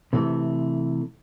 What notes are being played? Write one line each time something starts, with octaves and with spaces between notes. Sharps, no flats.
C3 E3 A3